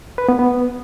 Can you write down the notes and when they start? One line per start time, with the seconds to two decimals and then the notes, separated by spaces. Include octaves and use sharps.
0.18 B4
0.29 B3
0.39 B3